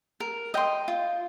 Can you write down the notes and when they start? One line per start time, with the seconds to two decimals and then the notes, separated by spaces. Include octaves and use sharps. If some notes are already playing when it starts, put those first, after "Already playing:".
0.20 A#4
0.54 D#5 G5 C6
0.88 F4